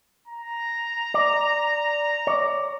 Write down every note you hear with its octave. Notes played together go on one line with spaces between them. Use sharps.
A#5
D5
C#5 D5